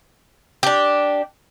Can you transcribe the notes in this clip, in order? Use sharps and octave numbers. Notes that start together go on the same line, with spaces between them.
D4 G4